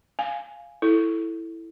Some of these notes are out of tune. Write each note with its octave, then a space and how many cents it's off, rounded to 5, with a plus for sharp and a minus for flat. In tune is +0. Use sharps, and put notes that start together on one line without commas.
F5 +0 G#5 +0
E4 +0 A4 +0